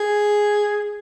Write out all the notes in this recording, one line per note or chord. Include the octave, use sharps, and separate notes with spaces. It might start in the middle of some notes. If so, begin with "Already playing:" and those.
Already playing: G#4